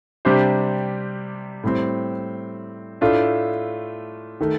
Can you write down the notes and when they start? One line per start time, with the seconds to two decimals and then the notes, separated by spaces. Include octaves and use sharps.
0.25 C3 G3 D4 G4 C5
1.64 A2 G3 C4
3.01 A2 A3 D4 F4
4.41 D#3 A3